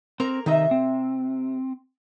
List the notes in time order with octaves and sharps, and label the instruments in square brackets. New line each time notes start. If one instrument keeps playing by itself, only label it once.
[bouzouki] A#3 A#4 A#5 [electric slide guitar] C4
[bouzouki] C3 E5 [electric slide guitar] D#3 D#4 D#5
[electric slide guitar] C4